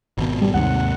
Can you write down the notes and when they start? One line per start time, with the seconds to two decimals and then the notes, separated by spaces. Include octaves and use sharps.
0.18 G#1 B2
0.41 G3
0.54 D#2 G#2 C3 F#5